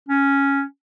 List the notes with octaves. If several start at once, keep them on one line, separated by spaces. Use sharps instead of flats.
C#4